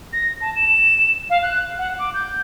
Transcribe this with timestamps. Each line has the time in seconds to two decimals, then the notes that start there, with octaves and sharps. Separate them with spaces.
0.13 A#6
0.41 A5
0.56 E7
1.30 F5
1.43 F#6
1.78 F#5
1.99 D6
2.14 G6